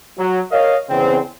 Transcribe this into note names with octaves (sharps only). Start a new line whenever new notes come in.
F#3
A#4 C#5 D#5 F5
E2 C#3 C4